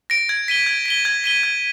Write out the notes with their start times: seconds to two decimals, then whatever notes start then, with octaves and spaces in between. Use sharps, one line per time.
0.10 A#6 D7
0.29 G#6
0.48 B6 D#7 G7
0.66 G#6
0.86 B6 D#7 G7
1.05 G#6
1.24 B6 D#7 G7
1.43 G#6